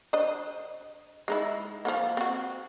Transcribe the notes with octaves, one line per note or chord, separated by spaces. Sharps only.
D4 C5 D#5
G#3 D#4 E4
F3 A#3 B3
C4 F#4